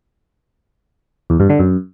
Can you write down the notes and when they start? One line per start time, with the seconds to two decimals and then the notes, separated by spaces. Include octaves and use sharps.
1.30 E2
1.40 G2
1.50 D3
1.59 F#2